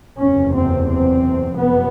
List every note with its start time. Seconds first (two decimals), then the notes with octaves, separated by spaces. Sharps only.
0.19 F#1 E2 C3 C#4
0.54 C4
0.88 C4
1.56 F#1 F2 C3 B3